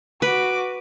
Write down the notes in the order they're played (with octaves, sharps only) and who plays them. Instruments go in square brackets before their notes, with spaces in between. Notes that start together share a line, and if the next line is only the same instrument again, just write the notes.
[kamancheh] F#4 D6 [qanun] B4